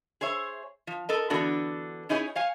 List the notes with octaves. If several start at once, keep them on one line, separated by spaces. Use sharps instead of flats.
G#4 C5 C#5 E5
F3
A4 A#4 D#5
D3 E3 B3 D4 F#4
C#4 D#4 E4 G#4 C#5
C#5 F5 G#5